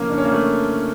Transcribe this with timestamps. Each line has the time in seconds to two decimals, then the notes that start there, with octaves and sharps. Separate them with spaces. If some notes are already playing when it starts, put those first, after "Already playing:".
Already playing: F2 C#3 E3 A#3 C#4
0.10 D4
0.18 C#4
0.25 A#3
0.32 A3